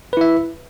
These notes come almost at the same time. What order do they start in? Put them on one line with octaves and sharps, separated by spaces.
B4 E4 E5